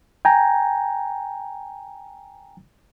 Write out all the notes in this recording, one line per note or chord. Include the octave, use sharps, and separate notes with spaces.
G5 G#5 A#5